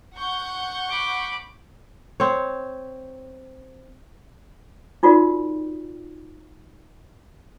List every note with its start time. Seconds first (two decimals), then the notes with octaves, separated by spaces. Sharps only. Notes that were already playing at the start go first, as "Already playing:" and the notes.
0.16 F#5 C#6 G6
0.89 B5 D6
2.20 C4 C#5
5.03 D#4 F4 F#4 A#4 D5